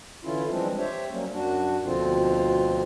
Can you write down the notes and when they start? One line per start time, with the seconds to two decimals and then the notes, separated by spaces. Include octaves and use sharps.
0.24 D3 E3 C#4 E4 F4
0.49 E3 F3 G3 G#3 C4 D4
0.78 G4 C5 C#5 E5
1.10 F#3 G3 A#3 C#4
1.32 F#2 D4 F#4
1.84 D2 B2 D3 F3 C4 F4